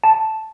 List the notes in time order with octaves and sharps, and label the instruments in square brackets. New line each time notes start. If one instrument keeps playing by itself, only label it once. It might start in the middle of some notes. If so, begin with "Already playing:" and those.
[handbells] A5